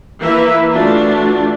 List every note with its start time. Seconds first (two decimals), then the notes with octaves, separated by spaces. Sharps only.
0.21 E3 A#3 E4 B4 E5
0.71 E3 A3 D4 F4 F#4